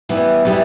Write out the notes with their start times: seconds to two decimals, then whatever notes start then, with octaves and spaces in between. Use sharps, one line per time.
0.09 E3 G3 B3
0.45 E3 G3 B3